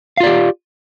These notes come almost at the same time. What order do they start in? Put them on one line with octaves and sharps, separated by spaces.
F5 F4 D5 G4